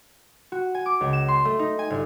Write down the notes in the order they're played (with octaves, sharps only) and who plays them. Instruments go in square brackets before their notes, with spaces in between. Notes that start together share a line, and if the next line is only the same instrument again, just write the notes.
[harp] F#4
G#5
D6
C#2
E7
C6
A3
D#4
G#5
G1